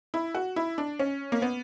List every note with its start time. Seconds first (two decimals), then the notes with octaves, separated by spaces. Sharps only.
0.14 E4
0.35 F#4
0.56 E4
0.78 D4
0.99 C#4
1.32 A#3
1.42 B3